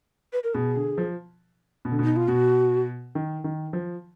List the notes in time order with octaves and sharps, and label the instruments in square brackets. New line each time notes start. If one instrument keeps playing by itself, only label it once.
[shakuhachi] B4
A#4
[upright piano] B2 [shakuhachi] G#4
[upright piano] D3
F3
B2
D3
[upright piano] B2 [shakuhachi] D#4
[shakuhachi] F4
[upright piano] B2 [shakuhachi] F#4
[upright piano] D#3
D#3
F3